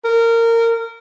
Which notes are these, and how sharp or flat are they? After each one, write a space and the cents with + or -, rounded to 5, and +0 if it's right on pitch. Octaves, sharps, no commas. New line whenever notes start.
A#4 -20